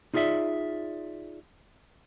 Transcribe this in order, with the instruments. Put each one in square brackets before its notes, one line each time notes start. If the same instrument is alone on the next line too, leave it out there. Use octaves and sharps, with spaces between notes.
[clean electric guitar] D#4 F4 G#4 D5 E5